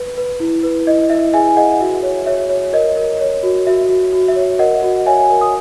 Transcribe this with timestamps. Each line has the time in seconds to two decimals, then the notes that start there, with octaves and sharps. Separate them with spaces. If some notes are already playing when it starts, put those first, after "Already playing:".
Already playing: B4
0.17 B4
0.40 E4
0.63 B4
0.87 E4 D#5
1.10 E4 E5
1.33 G#4 E5 G#5
1.56 G#4 D#5 F#5
1.80 F#4 E5
2.03 C#5
2.26 C#5 E5
2.49 C#5
2.73 A#4 D#5
2.96 A#4
3.20 C#5
3.43 F#4
3.67 F#4 E5
3.89 F#4
4.13 F#4
4.28 E5
4.36 C#5
4.59 A#4 D#5 F#5
4.82 F#4
5.06 C#5 E5 G#5
5.29 A#4
5.41 D#6